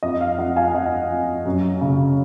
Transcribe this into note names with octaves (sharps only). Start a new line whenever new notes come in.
F2 D#5
F5
F2 D#5 F#5
F5 G#5
F2 D#5 F#5
F2
F#2
C#3